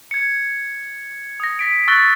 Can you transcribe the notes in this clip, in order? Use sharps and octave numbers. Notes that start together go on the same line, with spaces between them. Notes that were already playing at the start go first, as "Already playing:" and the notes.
G#6 C#7
D#6 A#6
A#6 B6 D7
C#6 E6 F#6 A6 A#6 G7